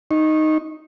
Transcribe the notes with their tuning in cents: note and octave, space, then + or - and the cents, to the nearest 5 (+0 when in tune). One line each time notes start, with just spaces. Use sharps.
D#4 +0 C#6 -25